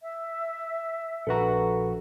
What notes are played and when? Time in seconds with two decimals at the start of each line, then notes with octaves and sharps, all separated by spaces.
0.03 E5
1.27 A#1 F#4 A4 B4 A#5